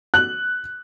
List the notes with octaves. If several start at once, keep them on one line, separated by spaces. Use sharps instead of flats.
F#6 F#7